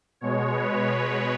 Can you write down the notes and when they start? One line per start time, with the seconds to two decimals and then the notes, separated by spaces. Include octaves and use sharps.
0.21 B2 G#3 C#5
0.52 B4
0.83 C#5